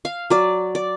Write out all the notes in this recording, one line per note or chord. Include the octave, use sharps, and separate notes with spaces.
F5
F#3 D5
D5